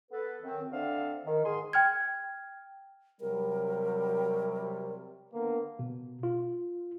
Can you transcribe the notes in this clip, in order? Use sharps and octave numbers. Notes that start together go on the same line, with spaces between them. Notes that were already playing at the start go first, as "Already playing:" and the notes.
B3 A4 B4
F#2 D#3 C4
D3 C4 D4 A4 E5 F5
D#3
G#2 D#3 G#4 G#5 C6
G5 F6 G#6
C3 F#3 G3 A#4
D3 A#3 B3
B2
F4